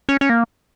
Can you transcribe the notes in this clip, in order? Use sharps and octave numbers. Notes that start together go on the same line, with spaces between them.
C#4
C#4
A#3